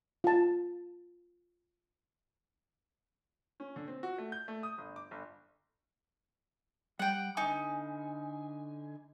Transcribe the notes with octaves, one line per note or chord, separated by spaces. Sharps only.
F4 A5
C#4
D3
C4
F#4
A3
G6
A3
D#6
G1
D6
G1
G3 F#5 G5
D3 D#4 G#5